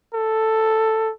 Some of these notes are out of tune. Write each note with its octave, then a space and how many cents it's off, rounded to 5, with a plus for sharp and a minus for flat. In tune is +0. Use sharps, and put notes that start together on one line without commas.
A4 +5